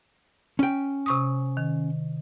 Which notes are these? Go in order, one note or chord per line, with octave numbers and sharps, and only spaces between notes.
C#4 G5
C3 C#6 D#6
D#3